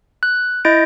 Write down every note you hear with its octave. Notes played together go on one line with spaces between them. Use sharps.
F#6
E4 D#5 G6 A6 A#6 D7